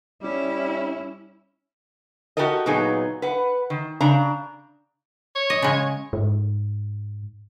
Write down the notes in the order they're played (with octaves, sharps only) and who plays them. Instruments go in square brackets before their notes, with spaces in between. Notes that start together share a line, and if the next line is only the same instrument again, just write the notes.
[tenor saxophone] G3 [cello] C#4 E4
[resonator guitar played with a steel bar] F#4 G4 A4 A#4 D#5
A#2 F#3 B3 D#4 G#4
B4 F#5
D#3
C#3 D4 A#5
[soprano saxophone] C#5
[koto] D#5
C#3 G#3
[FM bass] G#2